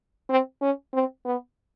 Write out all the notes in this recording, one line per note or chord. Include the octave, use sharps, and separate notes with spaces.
C4
C#4
C4
B3